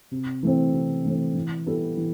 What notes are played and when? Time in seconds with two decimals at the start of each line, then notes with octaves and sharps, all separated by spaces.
0.11 C3
0.43 E3 A3 C4
0.73 C3
1.05 E3 A3 C4
1.35 E3
1.66 G3 B3 E4 A4
1.97 E3